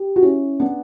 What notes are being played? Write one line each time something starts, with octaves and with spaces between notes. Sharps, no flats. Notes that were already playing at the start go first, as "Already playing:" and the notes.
Already playing: G4
F#4
C#4 E4
B3 D4